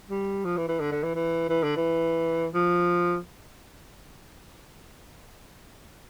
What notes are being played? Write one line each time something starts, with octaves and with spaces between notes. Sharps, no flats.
G3
F3
E3
E3
D3
D3
E3
E3
E3
D3
E3
F3